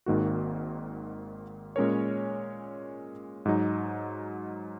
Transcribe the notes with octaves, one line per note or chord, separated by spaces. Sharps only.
G#1 G#2 D#3 A#3 F#4
A#2 G#3 C#4 A#4 C#5
G#2 F#3 D#4